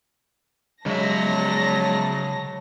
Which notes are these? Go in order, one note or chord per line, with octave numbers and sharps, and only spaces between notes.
C#3 F#3 G#3 E5 A5 A#6